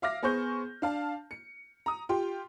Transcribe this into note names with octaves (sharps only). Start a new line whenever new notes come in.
E5 F5 D6 F6 A#6
B3 G#4 C5 C#6 G6
D4 F5 A5
C#7
A#5 D#6
F4 G4 G5 C6